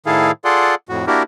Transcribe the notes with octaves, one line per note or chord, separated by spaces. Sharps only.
A2 D#3 E4 G#4 A4 F5
F4 G#4 A4 D5 F#5 C6
F2 A2 F#4
A#3 D4 E4 F#4 G4 A#4